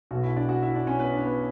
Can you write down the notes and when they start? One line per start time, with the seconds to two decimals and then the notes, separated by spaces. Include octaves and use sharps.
0.11 B1 B2 F#4
0.23 E4 E5
0.36 D4 D5
0.49 F#4 F#5
0.62 E4 E5
0.74 D4 D5
0.87 C#4 C#5
1.00 B3 B4
1.13 D4 D5
1.26 B3 B4